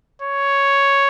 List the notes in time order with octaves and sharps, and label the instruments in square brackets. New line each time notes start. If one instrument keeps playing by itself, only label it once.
[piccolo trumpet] C#5